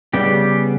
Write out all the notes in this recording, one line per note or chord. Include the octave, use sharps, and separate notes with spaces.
C#3 G3 B3 G4